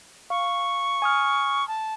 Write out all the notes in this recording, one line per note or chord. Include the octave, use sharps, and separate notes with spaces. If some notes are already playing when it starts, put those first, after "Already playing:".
F5 C#6
G#5 D#6 F6
A5